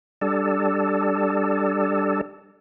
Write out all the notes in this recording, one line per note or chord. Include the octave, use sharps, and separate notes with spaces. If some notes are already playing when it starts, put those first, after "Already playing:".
G3 D4 A4